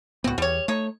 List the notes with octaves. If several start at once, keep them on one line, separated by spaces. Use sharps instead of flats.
C#2 A2 B3 C4 F#4
E2 G3 C#5
A3 D#4 C#5